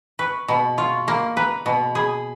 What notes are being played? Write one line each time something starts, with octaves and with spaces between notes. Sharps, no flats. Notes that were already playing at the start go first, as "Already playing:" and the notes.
B4 C#6
B2 B5
F4 C#6
A#3 B5
B4 A#5
B2 B5
G#4 B5